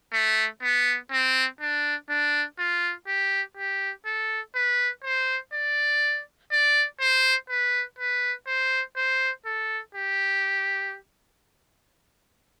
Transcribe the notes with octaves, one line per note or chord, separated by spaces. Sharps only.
A3
B3
C4
D4
D4
F4
G4
G4
A4
B4
C5
D5
D5
C5
B4
B4
C5
C5
A4
G4